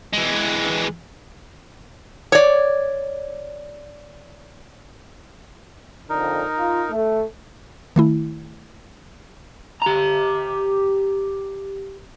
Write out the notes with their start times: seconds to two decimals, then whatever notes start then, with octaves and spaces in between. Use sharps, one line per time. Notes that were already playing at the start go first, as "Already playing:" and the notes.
0.13 E3 G#3
2.32 C#5 D5
6.10 F2 D3 D#4 A#4
6.59 F4
6.91 A3
7.96 D#3 A3 E4
9.82 G4 A#5